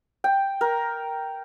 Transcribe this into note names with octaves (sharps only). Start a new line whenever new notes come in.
G5
A#4